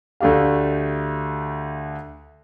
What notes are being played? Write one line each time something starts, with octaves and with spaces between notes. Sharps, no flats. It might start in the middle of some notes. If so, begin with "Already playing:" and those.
D2 A3 D4 G4 F5